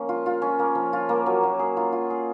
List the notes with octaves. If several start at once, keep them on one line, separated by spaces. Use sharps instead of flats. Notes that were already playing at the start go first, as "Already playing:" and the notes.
Already playing: F3 A#3 C#4
F4
F4
C#4
A#3
F3
F4
A#3
F#3
F#3
G#4
F4
F4
G#4